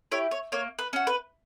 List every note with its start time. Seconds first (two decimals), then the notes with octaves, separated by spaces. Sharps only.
0.12 E4 G4 C#5
0.31 C#5
0.52 A#3 C#5
0.79 B4
0.93 C#4 F#4
1.07 B4